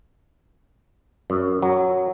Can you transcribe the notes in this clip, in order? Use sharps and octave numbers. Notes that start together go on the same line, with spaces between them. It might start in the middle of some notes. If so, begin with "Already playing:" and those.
F#2
F#3